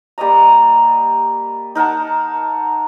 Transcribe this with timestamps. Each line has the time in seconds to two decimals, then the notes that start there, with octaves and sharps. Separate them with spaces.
0.18 G3 A#3 D#5 A#5
1.75 D#4 A#4 F#5 A5